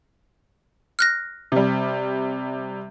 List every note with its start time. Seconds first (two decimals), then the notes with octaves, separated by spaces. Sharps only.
0.99 F6 F#6 A#6
1.52 C3 G3